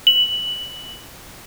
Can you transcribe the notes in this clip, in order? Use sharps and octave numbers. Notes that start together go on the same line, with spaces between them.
F#7